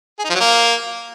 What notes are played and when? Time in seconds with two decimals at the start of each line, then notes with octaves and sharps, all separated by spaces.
0.19 G#4
0.24 D#4
0.30 F3
0.35 F#3
0.40 A#3